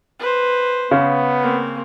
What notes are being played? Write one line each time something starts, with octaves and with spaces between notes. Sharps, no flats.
B4 C5
C#3 B3
A#3 C4